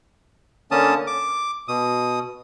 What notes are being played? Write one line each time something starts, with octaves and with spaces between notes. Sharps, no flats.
D3 A#3 C#4 A5 D#6
D6
B2 D#6